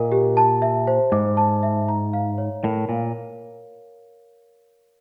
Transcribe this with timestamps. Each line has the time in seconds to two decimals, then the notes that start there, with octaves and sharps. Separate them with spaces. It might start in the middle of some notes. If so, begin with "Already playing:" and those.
Already playing: A#2 A#4 D#5
0.12 G4
0.37 A5
0.62 E5
0.87 C5
1.12 G#2 D6
1.37 A5
1.63 E5
1.88 A#5
2.13 F5
2.38 C#5
2.63 A2 A#4
2.89 A#2 F5